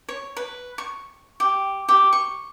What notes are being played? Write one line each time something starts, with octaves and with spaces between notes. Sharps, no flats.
C#5
B4
C#6
G4
G4
C#6